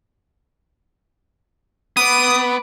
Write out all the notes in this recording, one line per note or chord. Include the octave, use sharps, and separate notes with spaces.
B3 B4 D6 D#6